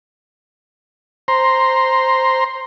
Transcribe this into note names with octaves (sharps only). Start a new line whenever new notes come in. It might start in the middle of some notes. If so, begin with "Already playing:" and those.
C5 A#5 C6